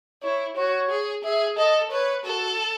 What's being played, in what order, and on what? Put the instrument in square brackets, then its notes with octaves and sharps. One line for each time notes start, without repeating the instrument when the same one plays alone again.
[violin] E4 [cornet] C#5
[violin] F#4 [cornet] C#5
[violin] G#4
[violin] G#4 [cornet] E5
[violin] A4 [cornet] D#5
[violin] B4 [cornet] C#5
[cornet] F#4 [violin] A4